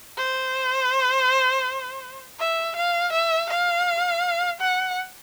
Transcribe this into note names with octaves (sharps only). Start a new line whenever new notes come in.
C5
E5
F5
E5
F5
F#5